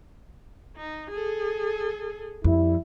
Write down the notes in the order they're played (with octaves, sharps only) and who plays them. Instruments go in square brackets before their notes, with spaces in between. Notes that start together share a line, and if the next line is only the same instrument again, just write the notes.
[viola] D#4
G#4 A4
[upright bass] F2 [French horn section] G3 E4